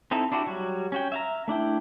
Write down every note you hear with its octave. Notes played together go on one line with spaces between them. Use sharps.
C4 D#4 E4 A4
D4 E4 F#4 G4
F#3 G3 F#4
C#4 F#4 G5
E5 F5 A#5
A3 D4 E4 G5